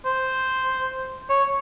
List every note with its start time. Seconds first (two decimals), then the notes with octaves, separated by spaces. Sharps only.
0.05 C5
1.30 C#5